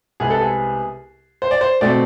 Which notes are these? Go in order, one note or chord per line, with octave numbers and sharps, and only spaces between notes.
C2 C3 G#3 B3 G#4
A4
G#4
C5
D5
C5
B2 A3 C4 D5